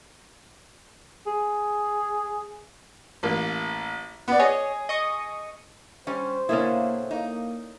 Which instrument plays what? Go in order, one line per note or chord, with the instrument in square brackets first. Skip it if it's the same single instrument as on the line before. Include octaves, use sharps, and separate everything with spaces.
[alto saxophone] G#4
[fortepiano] A1 A#3
B3 D5
[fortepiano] G#4 [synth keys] C#5 D#5
[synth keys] D#5 C#6 D#6
[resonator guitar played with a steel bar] G3 C#4 [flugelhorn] C5
[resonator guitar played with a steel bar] B2 D3 E4 [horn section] A#3 [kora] C#4 G#4
[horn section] A#3 [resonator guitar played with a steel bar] D#4